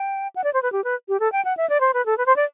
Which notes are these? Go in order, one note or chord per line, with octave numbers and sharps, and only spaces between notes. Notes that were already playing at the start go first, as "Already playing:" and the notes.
Already playing: G5
F#5
D5
C5
B4
G4
B4
G4
A4
G5
F#5
E5
D5
C5
B4
A4
B4
C5
D5